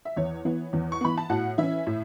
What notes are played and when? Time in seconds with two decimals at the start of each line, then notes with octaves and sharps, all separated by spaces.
0.05 E5
0.16 E2 C#5
0.45 E3 B3
0.73 E2
0.92 C#6
1.01 E3 B3 B5
1.17 A5
1.29 A2 F#4 F#5
1.58 E3 C#4 E4 E5
1.87 A2